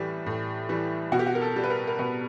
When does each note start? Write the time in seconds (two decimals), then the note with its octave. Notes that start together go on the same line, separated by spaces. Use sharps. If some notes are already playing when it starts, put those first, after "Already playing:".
Already playing: A2 E3 G3
0.26 A2
0.69 E3 G3
1.12 B2 F#4
1.19 G4
1.27 F#4
1.35 A#4
1.41 A4
1.56 G3
1.64 B4
1.70 A#4
1.87 A#4
1.99 B2 B4